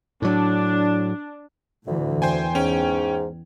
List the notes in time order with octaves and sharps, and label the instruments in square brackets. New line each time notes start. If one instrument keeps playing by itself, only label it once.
[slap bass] A2 F#3 [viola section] D4
[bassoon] D2 [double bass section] A2 D3 E3
[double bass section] E2 [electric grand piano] C5 G5 G#5
[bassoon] G#2 [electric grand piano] C#4 G5